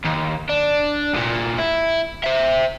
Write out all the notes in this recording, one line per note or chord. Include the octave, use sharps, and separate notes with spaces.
D#2
D4
C2 A#2
E4
C5 E5